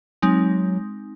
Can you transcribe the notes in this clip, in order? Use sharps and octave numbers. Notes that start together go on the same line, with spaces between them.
F#3 G#3 C4 D#4